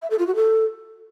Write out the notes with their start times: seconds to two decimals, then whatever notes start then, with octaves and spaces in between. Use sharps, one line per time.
0.02 E5
0.10 A4
0.19 F4
0.27 F#4
0.35 A4